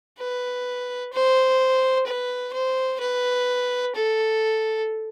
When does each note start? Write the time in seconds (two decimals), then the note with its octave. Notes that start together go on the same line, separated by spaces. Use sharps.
0.19 B4
1.13 C5
2.07 B4
2.53 C5
3.00 B4
3.95 A4